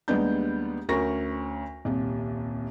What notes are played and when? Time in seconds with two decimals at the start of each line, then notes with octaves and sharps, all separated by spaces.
0.08 D#2 G3 G#3 B3 D4 G6
0.89 D2 C#4 A#4 C#6 A#6
1.85 D#1 C2